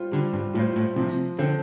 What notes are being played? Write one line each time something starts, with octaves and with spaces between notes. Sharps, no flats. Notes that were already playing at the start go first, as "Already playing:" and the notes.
Already playing: G3 F4 C5
D3 G3
G2
A2 F4 C5
A2
C3 F3
D3 C4 A4 C5